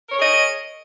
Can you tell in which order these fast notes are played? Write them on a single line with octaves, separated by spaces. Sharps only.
A#4 C#5 G#4 D#5